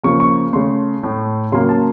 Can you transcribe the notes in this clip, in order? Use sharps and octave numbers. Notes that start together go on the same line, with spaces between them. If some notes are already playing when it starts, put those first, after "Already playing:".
C#3 F3 A#3 C#6
C#6
C#3 A3 C6
A2 A3
C#3 F#3 A#3 C6
A5